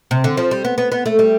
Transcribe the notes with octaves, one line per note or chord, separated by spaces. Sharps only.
C3
D3
F3
G3
B3
B3
B3
A3
G3